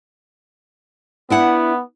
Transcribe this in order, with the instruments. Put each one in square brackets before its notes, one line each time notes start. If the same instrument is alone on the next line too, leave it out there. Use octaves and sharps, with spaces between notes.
[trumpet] B3 [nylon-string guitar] D4 E4 F#5